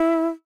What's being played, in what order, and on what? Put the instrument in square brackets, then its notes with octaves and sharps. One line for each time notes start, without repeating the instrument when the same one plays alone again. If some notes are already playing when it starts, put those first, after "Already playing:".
Already playing: [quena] E4